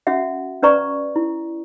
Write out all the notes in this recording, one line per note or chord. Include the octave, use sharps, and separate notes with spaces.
C#4 F#4 E5 F#5
C#4 B4 D5 A#5 C#6
E4